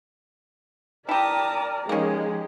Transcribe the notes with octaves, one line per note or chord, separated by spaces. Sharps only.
E4 G4 A#4 D5 G5 A5 A#5 D#6
F3 G#3 A#3 C#4 D#4 G4 G#4